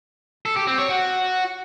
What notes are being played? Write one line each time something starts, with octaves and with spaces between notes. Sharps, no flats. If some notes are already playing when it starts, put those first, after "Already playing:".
A4
G4
C4
C#5
F#4